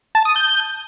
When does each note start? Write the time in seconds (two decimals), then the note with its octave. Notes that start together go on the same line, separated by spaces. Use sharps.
0.15 A5
0.25 D#6
0.36 G6